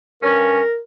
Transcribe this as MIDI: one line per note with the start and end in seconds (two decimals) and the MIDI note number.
0.23 0.60 43
0.23 0.60 61
0.23 0.79 70